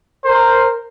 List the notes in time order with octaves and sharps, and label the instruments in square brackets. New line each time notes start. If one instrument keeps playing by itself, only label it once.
[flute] A#4 [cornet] C5